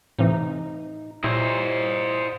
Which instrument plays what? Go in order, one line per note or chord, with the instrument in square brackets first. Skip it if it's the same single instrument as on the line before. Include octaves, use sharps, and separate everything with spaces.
[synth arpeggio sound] A2 C3 E3 [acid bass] D#4
[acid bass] A#2 [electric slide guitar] E4 G4 C#5 [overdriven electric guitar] C5 D#5